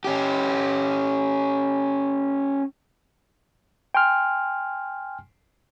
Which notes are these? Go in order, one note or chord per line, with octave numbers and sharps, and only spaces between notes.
C#4 G4
G5 G#5 C6 F6